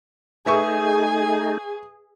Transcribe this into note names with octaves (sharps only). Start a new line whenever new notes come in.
A3 D#4 G#4 B4 E5 G#5 C#6